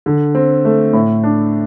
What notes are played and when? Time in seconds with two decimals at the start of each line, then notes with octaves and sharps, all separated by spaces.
0.06 D3
0.35 C4
0.65 A3
0.93 A2
1.24 D4